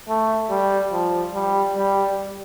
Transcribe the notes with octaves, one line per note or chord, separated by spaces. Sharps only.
A3
G3
F3
G3
G3